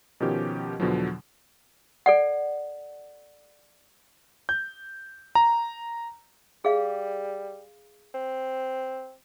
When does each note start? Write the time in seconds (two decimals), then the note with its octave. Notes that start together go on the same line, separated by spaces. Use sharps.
0.20 B2 D#3 F3 C#4 G4
0.80 E2 B2 D3 F3 F#3
2.06 A4 D5 F#5
4.49 G6
5.35 A#5
6.65 G3 G#4 F5
8.15 C4